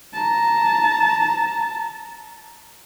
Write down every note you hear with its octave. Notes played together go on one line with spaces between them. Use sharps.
A5 A#5